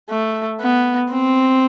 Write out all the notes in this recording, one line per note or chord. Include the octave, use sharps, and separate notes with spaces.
A3
B3
C4